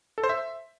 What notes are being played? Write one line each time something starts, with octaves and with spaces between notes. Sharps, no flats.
A4
C5
E5